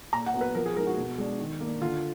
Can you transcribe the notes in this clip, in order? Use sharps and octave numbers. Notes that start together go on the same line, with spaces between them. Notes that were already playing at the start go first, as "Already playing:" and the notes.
A#2 A#5
F#5
F#3 B3
B4
F3 A#4
G#4
G#3 D#4 A#4
F#4
B2
G#3 D4
D#3
A#3 D4
D3 F4